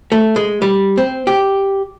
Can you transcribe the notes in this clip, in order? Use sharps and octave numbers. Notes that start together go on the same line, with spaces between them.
A3
G#3
G3
C4
G4